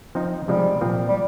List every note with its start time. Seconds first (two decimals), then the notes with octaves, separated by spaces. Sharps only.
0.15 F3 C4 D#4
0.48 C3 F3 G3 G#3 D#4
0.81 A#2 F3 C4
1.09 G3